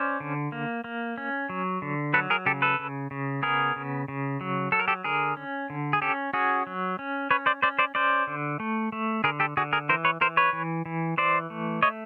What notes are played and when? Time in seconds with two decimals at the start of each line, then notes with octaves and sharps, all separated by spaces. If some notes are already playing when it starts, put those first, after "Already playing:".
Already playing: C#4 C5 D5
0.20 D3
0.52 A#3
0.84 A#3
1.18 C#4
1.50 F#3
1.82 D3
2.14 F#3 A4 B4
2.30 G#4 A#4
2.46 C#3 G4 A4
2.62 A4 B4
2.79 C#3
3.11 C#3
3.42 B3 G#4 A#4
3.76 C#3
4.08 C#3
4.41 F#3
4.72 F#3 A4
4.79 A#4
4.88 G4 A4
5.04 D3 G#4 A#4
5.37 C#4
5.70 D3
5.93 G#4
6.02 C#4 G4 A4
6.33 C#4 F#4 G#4
6.67 F#3
6.99 C#4
7.31 C#4 B4 C#5
7.46 C5 D5
7.62 C#4 C5 D5
7.79 C5 D5
7.95 C#4 C5 D5
8.27 D3
8.60 A3
8.92 A3
9.24 D3 G#4 A#4
9.40 G4 A4
9.57 D3 F#4 G#4
9.73 G#4 A#4
9.89 E3 A#4 C5
10.05 B4 C#5
10.21 E3 A#4 C5
10.37 B4 C#5
10.53 E3
10.86 E3
11.18 E3 C5 D5
11.50 A3
11.82 A3 C#5 D#5